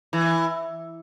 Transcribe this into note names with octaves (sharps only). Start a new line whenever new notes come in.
E3